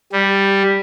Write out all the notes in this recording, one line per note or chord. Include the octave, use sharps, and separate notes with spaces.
G3